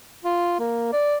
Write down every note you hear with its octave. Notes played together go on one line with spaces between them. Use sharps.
F4
A#3
D5